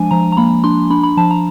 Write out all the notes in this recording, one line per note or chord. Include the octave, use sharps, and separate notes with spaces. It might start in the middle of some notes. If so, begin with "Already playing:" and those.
Already playing: F3 G#3 D4 G#5
F3 A#5
A#5
A#3 B5
D4 C6
D4 B5
B5
F3 A5
A#5